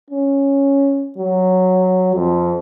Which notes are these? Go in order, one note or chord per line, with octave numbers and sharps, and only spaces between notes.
C#4
F#3
F2